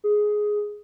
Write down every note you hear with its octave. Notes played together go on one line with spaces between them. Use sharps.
G#4